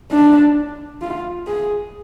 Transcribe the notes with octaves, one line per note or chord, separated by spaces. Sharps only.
D4
F4
G#4